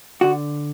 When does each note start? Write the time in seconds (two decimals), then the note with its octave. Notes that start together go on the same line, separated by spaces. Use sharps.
0.21 D3 F#4